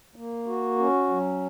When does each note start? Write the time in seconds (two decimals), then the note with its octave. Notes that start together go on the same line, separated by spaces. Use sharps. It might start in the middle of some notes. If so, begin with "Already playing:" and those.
0.16 A#3
0.47 F#4
0.78 C#4
1.10 F#3